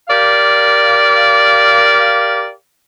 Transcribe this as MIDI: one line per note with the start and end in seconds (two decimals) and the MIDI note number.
0.08 2.50 67
0.08 2.50 70
0.08 2.50 74
0.08 2.50 77